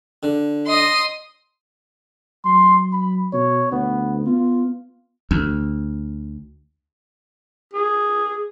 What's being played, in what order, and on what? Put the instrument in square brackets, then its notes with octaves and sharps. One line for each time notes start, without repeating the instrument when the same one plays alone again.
[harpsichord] D3
[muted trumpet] D#5 [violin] C6 D#6
[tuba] F#3 [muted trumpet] C6
[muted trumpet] B5
[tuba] B2 [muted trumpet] C#5
[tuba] D2 [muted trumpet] B3
[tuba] B3 [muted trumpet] F4
[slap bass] D2
[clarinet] G#4